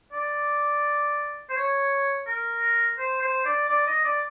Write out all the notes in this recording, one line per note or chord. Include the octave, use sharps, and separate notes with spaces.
D5
C5
C#5
A#4
C5
C5
D5
D5
D#5
D5